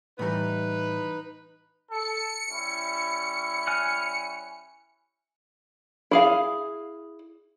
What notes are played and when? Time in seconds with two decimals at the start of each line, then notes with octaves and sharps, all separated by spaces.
0.19 A2 E3 G3 D#4 B4
1.91 A4 C#7
2.49 G3 C#4 E4
3.67 G#5 F6 F#6
6.11 E4 G#4 F5